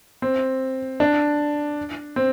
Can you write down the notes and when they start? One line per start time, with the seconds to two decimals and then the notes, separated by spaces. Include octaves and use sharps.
0.22 C4
1.00 D4
2.16 C4